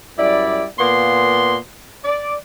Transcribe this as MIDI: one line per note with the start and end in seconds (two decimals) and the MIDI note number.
0.18 0.65 42
0.18 0.65 55
0.18 0.65 64
0.18 0.65 74
0.79 1.56 46
0.79 1.56 58
0.79 1.56 59
0.79 1.56 84
2.04 2.34 74